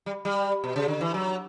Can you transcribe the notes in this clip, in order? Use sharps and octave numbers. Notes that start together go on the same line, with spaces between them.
G3
G3
B2
C#3
D3
E3
F#3